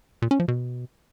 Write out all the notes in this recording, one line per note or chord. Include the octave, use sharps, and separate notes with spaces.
A#2
C#4
F3
B2